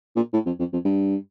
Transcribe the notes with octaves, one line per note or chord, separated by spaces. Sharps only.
A#2
A2
F2
F2
F2
G2